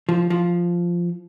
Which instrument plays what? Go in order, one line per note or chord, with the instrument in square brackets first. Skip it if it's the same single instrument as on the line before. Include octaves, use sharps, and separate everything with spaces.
[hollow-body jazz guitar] F3
F3